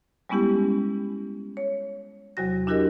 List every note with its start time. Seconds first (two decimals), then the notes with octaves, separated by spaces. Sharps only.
0.29 G3 G#3 B3 C#4 E4 G4
1.57 C#5
2.37 E2 C3 F#3 F#4 A#6
2.67 D4 E4 F#4 G4 A#4 D#5